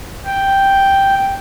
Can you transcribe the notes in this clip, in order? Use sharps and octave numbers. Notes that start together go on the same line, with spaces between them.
G5